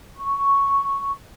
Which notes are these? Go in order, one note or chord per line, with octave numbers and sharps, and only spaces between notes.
C#6